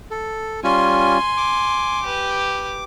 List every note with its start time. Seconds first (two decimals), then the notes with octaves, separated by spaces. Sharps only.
0.11 A4
0.64 G3 C#4 F4 G#5 C6
1.37 D6
2.03 G4 B4